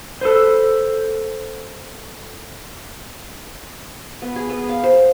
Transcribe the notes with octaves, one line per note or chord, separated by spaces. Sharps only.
A4 B4 C5
B3
G#4
B3
F5
C5